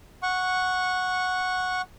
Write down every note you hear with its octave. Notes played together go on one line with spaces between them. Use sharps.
F#5 C#6